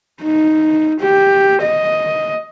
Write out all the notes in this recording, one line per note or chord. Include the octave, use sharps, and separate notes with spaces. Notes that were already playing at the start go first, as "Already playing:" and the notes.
D#4
G4
D#5